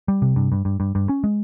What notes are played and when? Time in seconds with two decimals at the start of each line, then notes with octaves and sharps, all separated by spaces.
0.08 G3
0.22 C3
0.36 G2
0.52 G2
0.65 G2
0.80 G2
0.95 G2
1.09 C#4
1.24 G#3